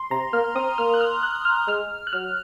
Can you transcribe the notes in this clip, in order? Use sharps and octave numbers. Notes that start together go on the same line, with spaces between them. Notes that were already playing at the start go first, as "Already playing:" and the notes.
Already playing: C6
C3 A#5
A#3 F6
C4 D#6
A#3 F6
F#6
F6
F#6
F6
G#3 F6
F#6
F#3 F6